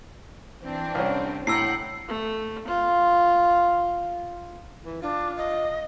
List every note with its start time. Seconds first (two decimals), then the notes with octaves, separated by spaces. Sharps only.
0.61 E3 C4 D4
0.95 C2 C#4
1.47 A2 F#5 G5 A#5 E6 C7
2.08 A3
2.68 F4
4.84 E3
5.02 D4 F4
5.37 D#5